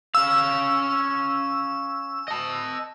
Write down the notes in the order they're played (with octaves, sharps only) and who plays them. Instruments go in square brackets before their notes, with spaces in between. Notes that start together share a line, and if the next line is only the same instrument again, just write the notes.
[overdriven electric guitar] C#4 F5 [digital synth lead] E6
[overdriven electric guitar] D#5 A5